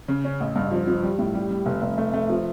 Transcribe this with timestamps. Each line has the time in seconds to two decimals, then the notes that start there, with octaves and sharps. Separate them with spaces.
0.08 C#3
0.25 C#4
0.40 A1
0.56 G2
0.71 F3
0.88 F3
1.03 G3
1.18 A2
1.34 G3
1.50 G3
1.66 F1
1.82 F1
1.98 A3
2.14 A3
2.30 F3